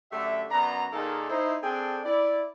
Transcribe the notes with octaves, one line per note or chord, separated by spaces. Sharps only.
F#2 D3 A3 G4 E5
F#2 B3 D4 A#5
A#2 D#3 A#3 D#4 G#4 A4
D#4 E4 C5
C4 D4 G#4 A4 G5
E4 D5